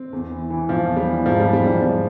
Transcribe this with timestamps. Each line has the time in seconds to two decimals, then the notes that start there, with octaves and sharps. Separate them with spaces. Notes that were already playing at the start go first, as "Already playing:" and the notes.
Already playing: C4
0.13 E2
0.31 E3
0.50 E3
0.69 E2 F3
0.88 E2
0.96 G3
1.07 E3
1.26 G#2 F3
1.40 G3
1.44 E3
1.53 G3
1.63 E3 F3
1.81 G#2 G3